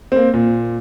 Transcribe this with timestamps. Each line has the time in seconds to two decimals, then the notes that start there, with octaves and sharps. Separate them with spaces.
0.12 A#3 C4
0.34 A#2